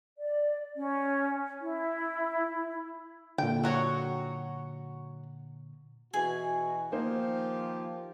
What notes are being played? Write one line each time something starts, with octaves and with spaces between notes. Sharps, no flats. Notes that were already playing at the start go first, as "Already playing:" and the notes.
D5
C#4
E4
A#2 D3 G5
F#3 F#4 C#5
B2 E3 F#4 G#4 G#5
D#3 F3 A#3 D#4 G4 C5